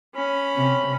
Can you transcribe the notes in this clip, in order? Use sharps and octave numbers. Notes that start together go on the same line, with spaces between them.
C#4 B5
C3